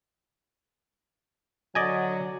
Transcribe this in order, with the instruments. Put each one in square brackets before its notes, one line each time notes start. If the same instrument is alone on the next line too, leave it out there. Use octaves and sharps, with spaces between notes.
[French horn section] D3 F#3 [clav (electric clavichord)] D5 D#5 G#5